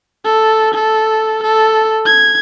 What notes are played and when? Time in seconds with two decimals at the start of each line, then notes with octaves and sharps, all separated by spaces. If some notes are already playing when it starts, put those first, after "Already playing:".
0.25 A4
0.74 A4
1.43 A4
2.05 G#6